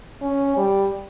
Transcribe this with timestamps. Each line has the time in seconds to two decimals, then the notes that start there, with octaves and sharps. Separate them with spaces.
0.22 C#4
0.57 G3